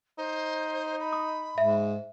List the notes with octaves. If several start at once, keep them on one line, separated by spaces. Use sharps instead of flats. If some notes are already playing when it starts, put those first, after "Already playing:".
D#4 C5
B5
D#6
G#2 E5